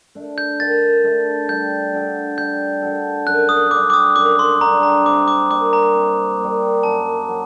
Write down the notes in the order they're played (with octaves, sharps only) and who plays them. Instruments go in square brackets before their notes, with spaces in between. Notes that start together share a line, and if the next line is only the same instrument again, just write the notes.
[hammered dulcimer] A3 D4
[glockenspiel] G6
[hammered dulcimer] D#3 [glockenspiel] A6
[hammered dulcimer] A3 D4
[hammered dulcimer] G3 [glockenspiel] G6
[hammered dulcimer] D4 F#4 A4
[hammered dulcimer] G3 [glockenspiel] G6
[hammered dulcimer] D4 F#4 A4
[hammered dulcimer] F#2 [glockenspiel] F#6
[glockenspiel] D#6
[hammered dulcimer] D3 G3 [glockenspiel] D6
[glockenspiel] D6
D#6
[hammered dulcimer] F#2 [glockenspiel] D6
[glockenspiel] C6
[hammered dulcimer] D3 G3 [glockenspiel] A#5
[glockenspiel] A#5
[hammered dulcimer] C3 [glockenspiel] D6
[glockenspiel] D6
[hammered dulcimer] G3 A#3 [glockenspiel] D6
[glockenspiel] A#5
[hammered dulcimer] C3
G3 A#3
[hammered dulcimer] F#2 [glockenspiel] A5
[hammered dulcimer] F#3